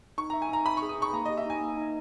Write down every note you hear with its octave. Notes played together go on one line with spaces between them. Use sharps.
D#4 C#6
E5 A#5
G#5
D#4 A#5
E5 B5
C#6
G#4
D#6
D#4 C#6
A#3 A#5
G4 D#5
E5
D#4 G#5
A#3
D#4